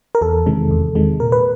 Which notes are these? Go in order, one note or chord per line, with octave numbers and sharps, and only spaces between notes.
A#4
E2 A4
C3 D#3 G#3
E2
C3 D#3 G#3
A#2 A#4
B4